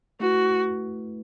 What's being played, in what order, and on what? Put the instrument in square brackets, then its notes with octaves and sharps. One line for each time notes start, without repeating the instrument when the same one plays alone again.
[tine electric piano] A3 E4 B4 [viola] F#4